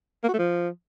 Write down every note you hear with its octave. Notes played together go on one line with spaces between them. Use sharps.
A#3
F#4
A3
F3